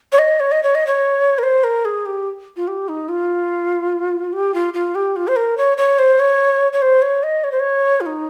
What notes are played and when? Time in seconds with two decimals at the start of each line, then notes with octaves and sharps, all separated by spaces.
0.12 C#5
0.19 D#5
0.40 C#5
0.52 D#5
0.63 C#5
0.75 D#5
0.87 C#5
1.38 A#4
1.43 C5
1.64 A#4
1.85 G#4
2.06 G4
2.57 F4
2.68 G4
2.88 D#4
3.09 F4
4.33 G4
4.54 F4
4.74 F4
4.95 G4
5.16 F4
5.28 C5
5.36 A#4
5.57 C#5
5.78 C#5
5.99 C5
6.20 C#5
6.73 C#5
6.82 C5
7.02 C#5
7.23 D#5
7.44 C#5
7.52 C5
7.60 C#5
8.01 F4
8.06 D#4